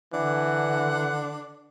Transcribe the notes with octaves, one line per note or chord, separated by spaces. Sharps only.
D3 E3 D4 F#5